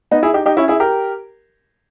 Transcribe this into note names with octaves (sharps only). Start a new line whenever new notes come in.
B3 D#4
E4 G#4
D#4 G4
D#4 G4
C#4 E4
E4 G#4
G4 A#4